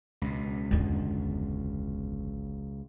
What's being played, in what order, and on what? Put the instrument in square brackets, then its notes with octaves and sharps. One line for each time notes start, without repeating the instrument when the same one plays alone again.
[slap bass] C#2 B2
[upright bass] G1 E2